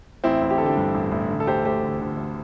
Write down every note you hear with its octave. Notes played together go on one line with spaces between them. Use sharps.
A1 C4 E4
A1
G4
D3 A4
D4 G4
G2
A1
A1
D3
A4
D2 G4 C5
D2 G4 C5
D3
D3
D2